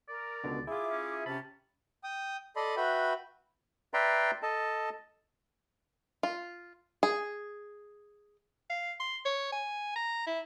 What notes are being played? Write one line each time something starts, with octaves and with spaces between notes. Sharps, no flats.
A#4 D5
C#2 B2 D3
E4 F4 G#4 E5 D6
C#4
C3 C#4 G4 A5 B5
G5 D#6
A4 D5 D#5 A5 B5 C6
F#4 B4 E5 G5 B5
B4 D5 E5 G5 A#5 C6
A4 D#5 A5
F4
G#4
F5
C6
C#5
G#5
A#5
E4